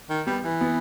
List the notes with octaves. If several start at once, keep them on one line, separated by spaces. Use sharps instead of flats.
D#3
G3 B3
E3
B3